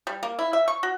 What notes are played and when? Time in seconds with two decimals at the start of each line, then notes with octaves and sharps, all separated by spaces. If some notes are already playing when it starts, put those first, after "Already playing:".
0.07 G3
0.23 A#3
0.39 E4
0.53 E5
0.68 C#6
0.83 F#4